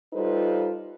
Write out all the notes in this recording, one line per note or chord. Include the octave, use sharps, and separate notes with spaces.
G3 D#4 F4 A4 B4 C5